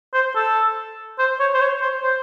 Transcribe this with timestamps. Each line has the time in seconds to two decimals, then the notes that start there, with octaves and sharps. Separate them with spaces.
0.14 C5
0.35 A4
1.19 C5
1.40 C#5
1.54 C5
1.61 C#5
1.82 C5
2.03 C5